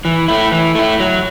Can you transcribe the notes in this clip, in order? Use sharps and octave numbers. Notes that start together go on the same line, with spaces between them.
E3
A3 E4
E3
A3 E4
F#3